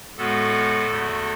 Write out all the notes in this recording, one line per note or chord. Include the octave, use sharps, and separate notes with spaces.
A2 G#3 B3 F#4 A4
E2 D3 A3